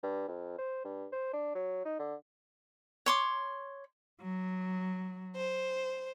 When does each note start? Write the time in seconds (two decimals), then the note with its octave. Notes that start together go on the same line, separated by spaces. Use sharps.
0.03 G2
0.28 F2
0.58 C5
0.84 G2
1.12 C5
1.33 D4
1.55 F#3
1.85 D#4
1.99 D3
3.06 C#5 C6 D6
4.21 F#3
5.36 C5